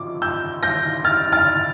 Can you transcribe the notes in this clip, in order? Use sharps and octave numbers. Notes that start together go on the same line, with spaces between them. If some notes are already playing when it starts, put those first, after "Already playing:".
Already playing: F3 D6
E6 G6
G6 A#6
F6 A6
F6 A6